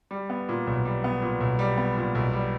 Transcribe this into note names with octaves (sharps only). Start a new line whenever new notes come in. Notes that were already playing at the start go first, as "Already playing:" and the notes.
G3
B3
A#2
B1
G3
B3
A#2
B1
G3
B3
A#2
B1
G3